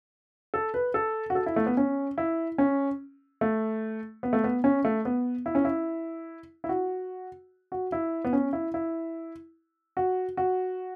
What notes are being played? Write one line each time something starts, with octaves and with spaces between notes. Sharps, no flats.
A4
B4
A4
F#4
A4
E4
A3
B3
C#4
E4
C#4
A3
B3
A3
B3
C#4
A3
B3
E4
C#4
E4
E4
F#4
F#4
E4
B3
C#4
E4
E4
F#4
F#4